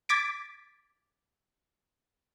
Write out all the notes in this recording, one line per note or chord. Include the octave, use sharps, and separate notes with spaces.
D6 G#6 A6 B6 D7